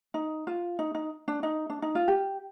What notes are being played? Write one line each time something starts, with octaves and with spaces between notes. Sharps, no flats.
D#4
F4
D#4
D#4
D4
D#4
D4
D#4
F4
G4